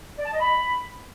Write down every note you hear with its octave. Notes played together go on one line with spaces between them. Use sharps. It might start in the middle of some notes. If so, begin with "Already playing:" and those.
D5
A5
D#5
B5